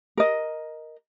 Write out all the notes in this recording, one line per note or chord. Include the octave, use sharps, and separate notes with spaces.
A#4 D#5